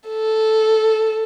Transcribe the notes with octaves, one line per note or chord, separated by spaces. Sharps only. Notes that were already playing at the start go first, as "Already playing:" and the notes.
A4